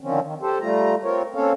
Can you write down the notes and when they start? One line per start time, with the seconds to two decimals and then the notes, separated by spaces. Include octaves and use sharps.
0.01 D3 D#3 F3 C4 C#4
0.23 D#3
0.41 G4 A4 C5
0.61 G3 A3 F4 A#5
1.03 C4 F4 A#4 C#5
1.35 A#3 C4 C#4 A4 C#5 F5